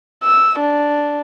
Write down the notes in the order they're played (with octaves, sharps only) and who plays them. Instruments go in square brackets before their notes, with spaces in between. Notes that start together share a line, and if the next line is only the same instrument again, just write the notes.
[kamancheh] E6
D4